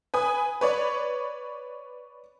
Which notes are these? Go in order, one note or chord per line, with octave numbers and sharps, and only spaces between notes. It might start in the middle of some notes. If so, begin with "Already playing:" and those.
B4 G#5 D#6
B4 C#5 D5